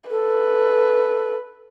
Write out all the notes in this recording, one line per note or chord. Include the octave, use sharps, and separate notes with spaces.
A4 B4